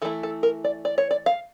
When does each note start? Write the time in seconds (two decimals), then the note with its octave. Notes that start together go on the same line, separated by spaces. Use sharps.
0.02 E3 A3 E4 A4
0.23 A4
0.43 A#4
0.64 D5
0.85 D5
0.98 C#5
1.11 D5
1.26 F5